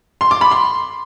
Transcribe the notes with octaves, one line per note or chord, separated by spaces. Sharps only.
C6
D6
B5
C6